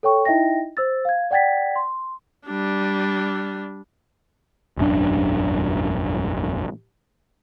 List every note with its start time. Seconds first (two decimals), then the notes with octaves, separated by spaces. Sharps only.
0.03 A4 C#5 G5 C#6
0.25 D#4 E4 D#5 E5 G5 A#6
0.77 C5 E6 A6
1.05 F5 G#6
1.31 D5 F#5 G5 G#6 A6 B6
1.76 C6
2.47 G3 D4
4.77 E1 A1 F#2 D4